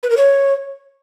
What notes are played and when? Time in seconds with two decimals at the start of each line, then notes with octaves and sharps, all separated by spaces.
0.03 B4
0.10 A#4
0.17 C#5